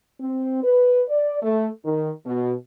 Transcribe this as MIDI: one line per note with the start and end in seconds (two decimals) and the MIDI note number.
0.20 0.61 60
0.63 1.03 71
1.09 1.39 74
1.42 1.68 57
1.85 2.10 51
2.26 2.53 47